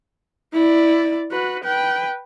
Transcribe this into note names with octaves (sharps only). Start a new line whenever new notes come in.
E4 D5
F#4 B4
B4 G5